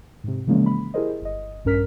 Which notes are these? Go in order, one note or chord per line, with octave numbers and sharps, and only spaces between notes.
G#2 C3
C#3 E3 F3 G#3 A#3 C#4
B5
E4 G4 G#4 A#4 C5 D#5
G1 D#5
A#1 G2 C#4 A#4 F6 B6